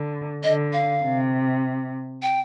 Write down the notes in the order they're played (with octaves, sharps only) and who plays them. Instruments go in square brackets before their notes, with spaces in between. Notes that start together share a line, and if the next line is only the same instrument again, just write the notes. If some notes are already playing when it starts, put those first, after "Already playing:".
Already playing: [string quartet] D3
[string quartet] D3 [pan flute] D#5
[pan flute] F5
[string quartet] C3
[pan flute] G5